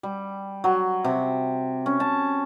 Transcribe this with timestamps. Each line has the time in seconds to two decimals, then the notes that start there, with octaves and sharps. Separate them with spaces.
0.03 G3
0.64 F#3
1.04 C3
1.86 C#4
2.00 A5